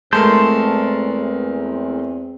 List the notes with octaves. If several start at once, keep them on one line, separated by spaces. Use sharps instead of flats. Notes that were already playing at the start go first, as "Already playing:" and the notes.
E2 G#3 A3 C4 A#4 A5 C6 G6